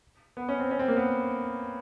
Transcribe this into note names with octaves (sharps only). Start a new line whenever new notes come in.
B3
C#4
C4
C#4
C4
A#3
B3